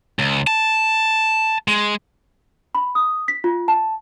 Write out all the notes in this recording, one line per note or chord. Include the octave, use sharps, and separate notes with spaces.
C#2
A5
G#3
B5
D#6
B6
F4
A5